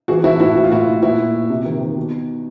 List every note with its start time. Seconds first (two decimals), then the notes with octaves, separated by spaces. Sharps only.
0.08 E3 F#4 G#4
0.24 E3 E4 F#4
0.39 A2 E4 F#4
0.55 A2 F#4
0.64 F4
0.71 A2 E4 F#4
0.87 A2
1.02 A#2 E4 F#4
1.18 A#2
1.34 A#2
1.50 C3
1.66 D#3
1.81 D#3
1.96 B2